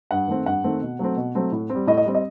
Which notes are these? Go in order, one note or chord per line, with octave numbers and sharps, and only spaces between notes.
G2 F#5
D#3 A3 C4
G2 F#5
D#3 A3 C4
B2
F#3 A3 C4
B2
F#3 A3 C4
A2
C4
G3
A2 D#5
D#5
G3 C4
D#5